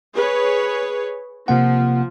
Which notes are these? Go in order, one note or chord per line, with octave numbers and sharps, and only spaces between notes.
G#4 B4 C#5
C3 F3 A#3 F#5